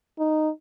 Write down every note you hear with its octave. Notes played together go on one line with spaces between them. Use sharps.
D#4